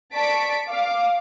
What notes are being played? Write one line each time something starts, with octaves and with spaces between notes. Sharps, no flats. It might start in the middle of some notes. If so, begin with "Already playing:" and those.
D5 A5 C#6 B6 D7
F5 D6